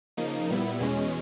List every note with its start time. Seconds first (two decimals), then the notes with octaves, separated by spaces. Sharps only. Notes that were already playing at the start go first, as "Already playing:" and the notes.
0.17 C#3 F3 A#3 D#4
0.50 A#2 G3 B3 E4
0.80 E2 B2 G#3 C#4